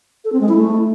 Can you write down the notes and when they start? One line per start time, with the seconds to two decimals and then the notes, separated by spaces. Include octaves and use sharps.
0.25 A4
0.33 C4
0.41 G#3
0.49 E4
0.57 A3